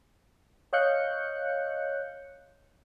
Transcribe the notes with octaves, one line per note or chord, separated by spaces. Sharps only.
C#5 D#5 F5 F#6 G6 C#7